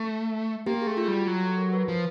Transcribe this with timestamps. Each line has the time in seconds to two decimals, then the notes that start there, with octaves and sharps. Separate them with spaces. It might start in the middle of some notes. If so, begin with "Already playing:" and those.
Already playing: A3
0.66 A#3 G4
0.82 G#4
0.87 A3
0.97 F4
1.08 G3 F#4
1.27 F#3 G4
1.43 A4
1.58 A#4
1.73 B4
1.88 F3